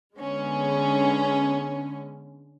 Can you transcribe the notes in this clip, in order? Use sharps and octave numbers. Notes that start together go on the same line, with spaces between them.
D3 G#3 B3 C#4